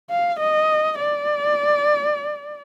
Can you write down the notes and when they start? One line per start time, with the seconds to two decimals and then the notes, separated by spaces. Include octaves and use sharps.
0.10 F5
0.40 D#5
0.99 D5